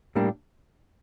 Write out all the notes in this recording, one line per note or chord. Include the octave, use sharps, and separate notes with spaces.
A2 G3 A#3 D4 G4